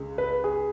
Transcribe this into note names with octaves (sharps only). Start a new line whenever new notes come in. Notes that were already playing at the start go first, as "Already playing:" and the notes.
Already playing: C#2 C#3 G#3
B4
G#4